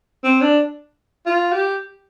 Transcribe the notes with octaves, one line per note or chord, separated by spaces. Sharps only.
C4
D4
F4
G4